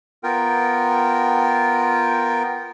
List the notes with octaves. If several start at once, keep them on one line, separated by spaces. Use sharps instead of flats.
B3 F4 A#4 G5